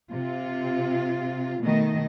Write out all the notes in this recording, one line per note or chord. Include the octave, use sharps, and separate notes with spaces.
C3 F4
B2 D#3 A3 D#5